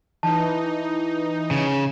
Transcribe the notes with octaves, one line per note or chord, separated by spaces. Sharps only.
E3 D#4 A5
C#3